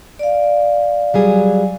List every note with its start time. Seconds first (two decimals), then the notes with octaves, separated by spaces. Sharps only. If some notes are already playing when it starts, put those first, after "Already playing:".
0.19 D5 F5
1.14 F#3 G3 G#4